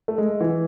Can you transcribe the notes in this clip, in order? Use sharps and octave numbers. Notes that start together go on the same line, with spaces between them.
A3
G#3
E3